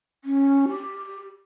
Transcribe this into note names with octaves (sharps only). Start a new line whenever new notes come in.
C#4
G4